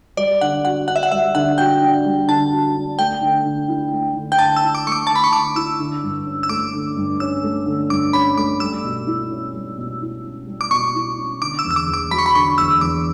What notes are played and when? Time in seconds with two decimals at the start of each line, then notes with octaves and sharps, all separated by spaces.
0.17 G3 D5
0.41 D3 F#5
0.65 F#4 F#5
0.88 D4 F#5
0.96 E5
1.03 F#5
1.11 G3 E5
1.35 D3 F#5
1.58 F#4 G5
1.81 D4
2.05 G3
2.28 D3 A5
2.51 F#4
2.76 D4
2.99 A3 G5
3.21 D3
3.45 D3
3.68 E4
3.92 A3
4.16 D3
4.32 G5
4.38 D3 A5
4.56 E6
4.63 E4
4.75 D6
4.86 A3 C#6
4.92 D6
5.07 D3 A5
5.16 B5
5.24 C#6
5.32 D3 D6
5.55 E4 E6
5.79 D3
6.03 G2
6.26 C#4
6.43 E6
6.49 A3 D6
6.73 D3
6.97 G2
7.20 C#4 E6
7.43 A3
7.66 D3
7.90 G2 D6
8.13 C#4 B5
8.37 A3 D6
8.60 G3 E6
8.83 B2
9.07 E4
9.31 C#4
9.54 G3
9.78 B2
10.01 E4
10.25 C#4
10.47 G3
10.61 D6
10.71 B2 C#6
10.95 E4
11.18 C#4
11.41 D3 D6
11.59 E6
11.65 E2
11.71 E6
11.76 D6
11.87 E2
11.94 D6
12.11 F#3 B5
12.19 C#6
12.26 B5
12.35 D3 C#6
12.58 E2 E6
12.81 E2 D6